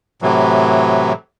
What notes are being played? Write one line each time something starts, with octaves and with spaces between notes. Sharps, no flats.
A2 C3 E3 F#3